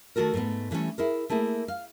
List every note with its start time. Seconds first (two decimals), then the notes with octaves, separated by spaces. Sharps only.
0.16 D#3 A3 F#4 A4 A#4
0.34 G#2 A3 B3
0.71 D3 E3 G3 A3 C#4
0.98 E4 G#4 A#4
1.30 A3 A#3 E4 G#4
1.68 F5